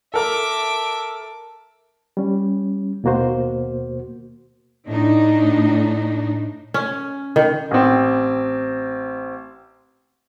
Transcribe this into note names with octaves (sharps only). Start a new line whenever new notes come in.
A4 A#4 E5 D6
G3 C#4
D#2 B2 A#3 F#4 C5
A2 D4 D#4
C#4
D#3
A1 C4